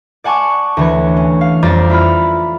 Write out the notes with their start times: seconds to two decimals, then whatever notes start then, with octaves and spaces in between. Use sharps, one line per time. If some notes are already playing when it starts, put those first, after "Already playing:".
0.24 D5 F#5 G#5 A5 C#6 D6
0.77 D2 E3 C#5
1.17 C#4
1.41 F5
1.63 F2 G3 F4 D5 A#5 A6
1.90 E4 F4 B5 F6